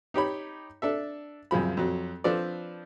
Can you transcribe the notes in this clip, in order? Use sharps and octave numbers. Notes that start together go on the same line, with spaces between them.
D#4 G4 C#5 B5
D4 A4 E5
C2 F#2 C#3 F3 B5
F2 F#3
F3 C4 D4 A4 B4 D5